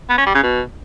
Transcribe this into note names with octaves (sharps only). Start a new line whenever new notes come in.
B3
C#4
G3
C#3
B2